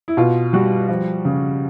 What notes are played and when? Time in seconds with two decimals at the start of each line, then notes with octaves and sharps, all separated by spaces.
0.08 E4
0.17 B2 F4
0.53 G3 F#4
0.88 F3
1.25 C#3